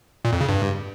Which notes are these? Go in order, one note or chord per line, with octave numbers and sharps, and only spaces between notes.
A#2
F2
C#3
G2